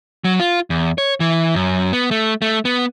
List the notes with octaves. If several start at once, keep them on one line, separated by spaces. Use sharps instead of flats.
F#3
F4
E2
C#5
E3
F#2
B3
A3
A3
B3